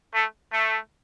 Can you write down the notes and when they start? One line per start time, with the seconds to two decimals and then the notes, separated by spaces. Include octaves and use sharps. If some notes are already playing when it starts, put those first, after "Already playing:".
0.14 A3
0.53 A3